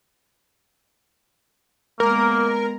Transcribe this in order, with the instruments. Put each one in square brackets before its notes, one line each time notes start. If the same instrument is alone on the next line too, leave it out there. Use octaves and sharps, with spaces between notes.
[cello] G#3 B3 [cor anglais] A#3 [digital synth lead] A#4